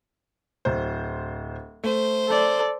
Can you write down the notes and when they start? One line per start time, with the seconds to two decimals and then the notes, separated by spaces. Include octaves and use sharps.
0.65 D1 C5
1.84 A3 C5
2.28 A4 D5